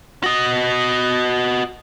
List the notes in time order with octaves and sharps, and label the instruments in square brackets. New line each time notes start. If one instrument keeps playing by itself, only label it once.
[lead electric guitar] F#4 D#5